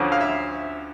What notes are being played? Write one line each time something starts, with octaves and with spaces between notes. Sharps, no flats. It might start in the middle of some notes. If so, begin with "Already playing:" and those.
Already playing: D2 D3 F3 C#4
F5
E5